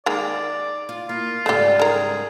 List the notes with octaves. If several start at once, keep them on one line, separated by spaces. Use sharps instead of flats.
D#3 G#3 A#3 D5
F4
A#3 E4 F4
G#2 C#3 G3 A3 G4
D#3 G#4 A#4